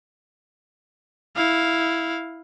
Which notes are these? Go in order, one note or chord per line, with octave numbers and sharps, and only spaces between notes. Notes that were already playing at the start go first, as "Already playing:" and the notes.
E4 F5